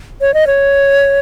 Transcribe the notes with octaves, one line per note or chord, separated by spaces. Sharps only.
C#5
D#5
C#5